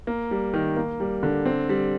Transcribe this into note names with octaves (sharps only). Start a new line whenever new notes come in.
A#3
G3
D#3
A#3
G3
D3
C4
G3